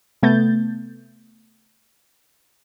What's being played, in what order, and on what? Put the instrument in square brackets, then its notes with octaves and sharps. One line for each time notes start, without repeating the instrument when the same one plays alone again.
[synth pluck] C3 A3 B3 G6 A6